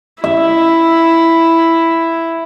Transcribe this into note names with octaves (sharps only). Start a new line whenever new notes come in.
E4 E5